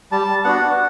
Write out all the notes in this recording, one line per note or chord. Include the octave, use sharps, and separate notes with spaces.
G3 A5
B3 D4 F#4 F#5